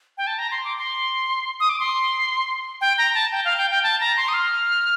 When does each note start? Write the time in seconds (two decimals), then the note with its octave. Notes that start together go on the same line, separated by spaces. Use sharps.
0.18 G5
0.27 A5
0.39 A#5
0.51 C6
0.64 D6
0.78 C6
1.60 D#6
1.69 D6
1.80 C6
2.81 G5
2.98 A#5
3.14 A5
3.32 G5
3.45 F5
3.58 G5
3.71 G5
3.84 A5
4.00 A#5
4.17 C6
4.28 D#6
4.34 F6